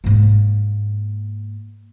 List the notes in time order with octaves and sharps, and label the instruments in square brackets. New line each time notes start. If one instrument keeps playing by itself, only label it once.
[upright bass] G#2 A#3